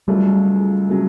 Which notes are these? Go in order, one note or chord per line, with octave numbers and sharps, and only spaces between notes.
C#2 C#3 F#3 G3 A3
C#3 F#3 A3